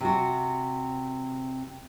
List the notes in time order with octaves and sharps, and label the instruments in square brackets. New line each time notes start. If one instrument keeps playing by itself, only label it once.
[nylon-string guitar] C3 F#4